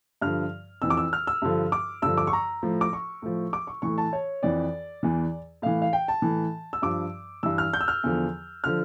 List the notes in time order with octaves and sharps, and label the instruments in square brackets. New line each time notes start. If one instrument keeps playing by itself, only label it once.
[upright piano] G2 D3 F3 F6
F2 E3 E6
D6
E6
F6
E6
G2 D3 F3
D6
G2 D3 F3 E6
D6
C#6
A#5
A2 F3
D6
C#6
A2 F3
D6
C#6
A2 E3 C#6
A5
C#5
F2 E3 D5
E2 E3
A2 E3 F5
F5
G5
A5
A2 E3
E6
G2 F3 D6
G2 E3 E6
F6
G6
E6
F6
E2 D3 F3
D3 F3 F6